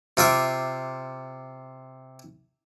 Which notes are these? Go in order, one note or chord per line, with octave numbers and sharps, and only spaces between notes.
C3 F4 E5 D6